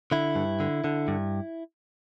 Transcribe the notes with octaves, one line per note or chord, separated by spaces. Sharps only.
D3 E4
G2
D3
D3
G2